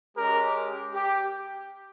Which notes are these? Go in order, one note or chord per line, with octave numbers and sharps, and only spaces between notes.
G#3 C#4 G4 A#4
G4